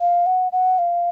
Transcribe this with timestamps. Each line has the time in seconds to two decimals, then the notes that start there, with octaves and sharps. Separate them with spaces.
0.01 F5
0.26 F#5
0.52 F#5
0.79 F5